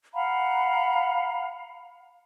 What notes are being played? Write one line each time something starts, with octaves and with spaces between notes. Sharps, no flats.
F5 F#5 A#5 B5